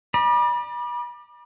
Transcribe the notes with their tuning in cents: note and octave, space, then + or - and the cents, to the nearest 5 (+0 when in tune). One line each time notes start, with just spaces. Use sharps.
D5 +30 B5 -35